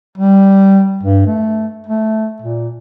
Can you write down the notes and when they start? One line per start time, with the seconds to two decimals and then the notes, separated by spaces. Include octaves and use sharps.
0.18 G3
1.03 G2
1.27 A3
1.87 A3
2.42 A#2